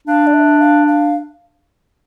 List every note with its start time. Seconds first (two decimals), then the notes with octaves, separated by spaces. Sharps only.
0.07 D4 F5
0.27 D5
0.34 E5
0.60 F5
0.88 F5